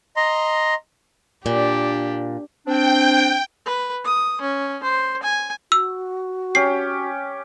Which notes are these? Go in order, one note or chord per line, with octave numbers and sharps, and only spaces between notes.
D#5 A#5 C6
A#2 D4 G4
C4 D4 G5
B4
D#6
C#4
C5
G#5
F#4 E6
C#4 G4 C7